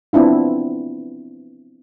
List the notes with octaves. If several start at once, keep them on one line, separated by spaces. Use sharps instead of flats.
B3 C4 D4 E4 F4